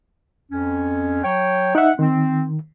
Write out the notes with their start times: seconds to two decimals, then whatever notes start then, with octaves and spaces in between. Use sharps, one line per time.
0.51 F2 C#4
1.23 F#3 C#5 G5
1.75 D#4 E5 F#5
1.99 D#3 C4